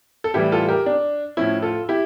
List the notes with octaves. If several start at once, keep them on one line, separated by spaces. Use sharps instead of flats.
A4
A2 E3 G3 E4 G4
F4 A4
G4 A#4
D4
A2 F3 C#4 E4
F4 A4
E4 G4